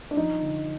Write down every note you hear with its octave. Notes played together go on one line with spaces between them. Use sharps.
D4
F3 D#4
D3